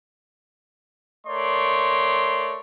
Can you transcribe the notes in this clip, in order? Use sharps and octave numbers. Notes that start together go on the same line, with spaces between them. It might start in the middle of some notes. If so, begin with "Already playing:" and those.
A3 A#4 C#5 D5 C6